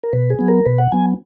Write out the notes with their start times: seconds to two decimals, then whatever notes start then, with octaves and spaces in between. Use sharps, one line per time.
0.03 A#4
0.13 B2 B4
0.30 G#4
0.39 F#3 B3
0.48 A#4
0.66 B2 B4
0.78 F#5
0.92 F#3 B3 G#5